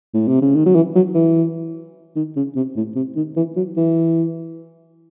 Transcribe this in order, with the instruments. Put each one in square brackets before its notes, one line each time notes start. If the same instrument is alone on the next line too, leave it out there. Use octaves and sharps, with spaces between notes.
[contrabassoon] A2
C3
C#3
D#3
F#3
E3
F#3
E3
D#3
C#3
C3
A2
C3
D#3
E3
F#3
E3